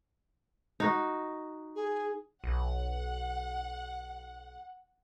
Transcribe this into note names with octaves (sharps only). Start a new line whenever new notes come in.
D#4 F#4
G#4
B1 F#5